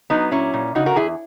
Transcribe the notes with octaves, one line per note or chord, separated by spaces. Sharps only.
F#3 B3 D#4
A#2 C#4 E4
A#2
C#3 D#4 F#4
F#4 A#4
E2 E4 G#4